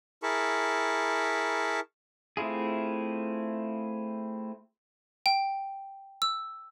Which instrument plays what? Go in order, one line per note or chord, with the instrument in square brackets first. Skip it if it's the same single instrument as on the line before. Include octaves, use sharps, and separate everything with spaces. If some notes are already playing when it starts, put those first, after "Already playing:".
[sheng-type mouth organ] E4 G#4 A#4 A5 B5 C#6
[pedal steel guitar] A3 C4 E4 F4 G#4
[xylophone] G5
E6